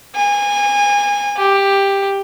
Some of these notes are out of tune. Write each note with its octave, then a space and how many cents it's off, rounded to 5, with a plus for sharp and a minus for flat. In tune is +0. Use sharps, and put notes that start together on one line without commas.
G#5 -25
G4 +10